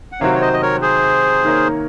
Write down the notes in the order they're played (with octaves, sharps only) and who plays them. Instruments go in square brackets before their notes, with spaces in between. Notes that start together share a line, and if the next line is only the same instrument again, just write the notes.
[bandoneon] F#5
[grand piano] C3 D#3 F#3 C4 F#4 [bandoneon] C#5 F5
[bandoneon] C#5
C5 D#5
D#5
A#4 C#5
G#4 C5
[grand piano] D#3 A#3 D#4 A#4 C#5